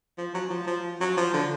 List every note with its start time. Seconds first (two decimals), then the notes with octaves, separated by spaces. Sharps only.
0.18 F3
0.34 F#3
0.50 F3
0.67 F3
1.00 F#3
1.17 F3
1.34 D3